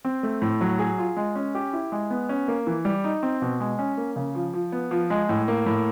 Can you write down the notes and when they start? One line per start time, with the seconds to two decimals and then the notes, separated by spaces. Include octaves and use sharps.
0.05 C4
0.23 A3
0.42 A2
0.61 F#3
0.79 G#4
0.98 F4
1.17 G#3
1.36 C#4
1.55 G4
1.73 E4
1.92 G#3
2.10 B3
2.29 C#4
2.48 A#3
2.67 E3
2.85 G3
3.04 D#4
3.23 C4
3.42 B2
3.60 G#3
3.79 C#4
3.97 A#3
4.16 C#3
4.35 F3
4.54 F3
4.72 B3
4.91 F3
5.10 G#3
5.29 A2
5.48 A#3
5.66 A2